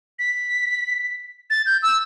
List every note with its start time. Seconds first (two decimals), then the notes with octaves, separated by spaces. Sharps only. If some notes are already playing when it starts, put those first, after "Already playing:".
0.19 B6
1.50 A6
1.66 G6
1.83 E6